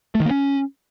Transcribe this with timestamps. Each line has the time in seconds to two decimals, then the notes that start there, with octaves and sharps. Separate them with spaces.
0.15 A3
0.20 D#3
0.25 A#3
0.31 C#4